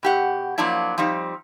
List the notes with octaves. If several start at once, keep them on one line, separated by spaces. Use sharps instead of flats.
B2 G4 F#5
F3 F#3 A#3 D4 E4
F3 G3 C4 D#4